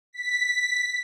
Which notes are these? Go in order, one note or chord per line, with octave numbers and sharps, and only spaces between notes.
B6